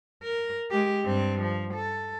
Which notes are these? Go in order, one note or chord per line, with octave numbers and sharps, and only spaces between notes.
A#4
G#3 G4
G2 C4
F3
A4